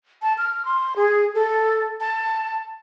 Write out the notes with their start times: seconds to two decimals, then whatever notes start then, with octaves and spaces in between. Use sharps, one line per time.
0.22 A5
0.38 F6
0.65 C6
0.96 G#4
1.35 A4
2.00 A5